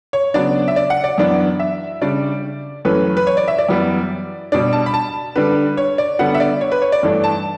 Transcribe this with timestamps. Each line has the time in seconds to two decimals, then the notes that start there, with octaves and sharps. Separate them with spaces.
0.13 C#5
0.34 C#3 F#3 B3 D4 D5
0.68 E5
0.76 D5
0.90 F#5
1.04 D5
1.18 F#2 E3 B3 D4
1.59 E5
2.01 C#3 G3 D4 D5
2.85 F#2 E3 A3 C#4 B4
3.17 B4
3.27 C#5
3.37 D5
3.48 E5
3.59 D5
3.69 F#2 E3 G3 B3
4.52 B2 G3 D4 D5
4.73 A5
4.86 B5
4.94 A5
5.36 D3 G3 D4 B4
5.77 C#5
5.98 D5
6.19 D3 G3 B3 F#5
6.34 E5
6.40 D5
6.61 C#5
6.72 B4
6.82 C#5
6.92 D5
7.03 G2 E3 A3 D4
7.24 A5